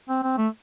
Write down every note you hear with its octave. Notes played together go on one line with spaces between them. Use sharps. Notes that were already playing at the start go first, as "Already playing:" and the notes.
C4
C4
A3